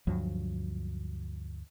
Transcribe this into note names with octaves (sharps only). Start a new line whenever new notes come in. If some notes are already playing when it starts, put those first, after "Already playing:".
D2 G2 F3 F#3